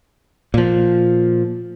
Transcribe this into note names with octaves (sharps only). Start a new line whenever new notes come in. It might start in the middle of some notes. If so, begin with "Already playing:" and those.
A#2 F3